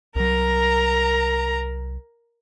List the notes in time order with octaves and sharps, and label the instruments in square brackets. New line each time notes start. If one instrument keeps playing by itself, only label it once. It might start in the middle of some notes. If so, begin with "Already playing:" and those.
[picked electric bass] C2 F#3 [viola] A#4 A#5